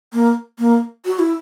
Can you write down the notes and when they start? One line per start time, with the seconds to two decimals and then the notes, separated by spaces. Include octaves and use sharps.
0.13 A#3
0.59 A#3
1.05 F#4
1.19 E4